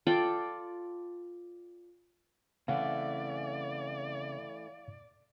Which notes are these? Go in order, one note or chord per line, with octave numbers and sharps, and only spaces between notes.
F4 A4 D5 G5
C#3 E3 A3 C4 E4 D5 F5 F#5